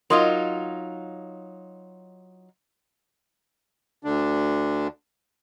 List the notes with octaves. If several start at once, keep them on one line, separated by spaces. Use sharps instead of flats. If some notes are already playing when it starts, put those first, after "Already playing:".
F#3 D#4 F4 A#4 C6 D#6
D2 D3 D4